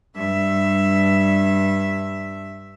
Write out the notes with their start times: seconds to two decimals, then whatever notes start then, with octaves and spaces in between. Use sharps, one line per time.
0.16 G2 E5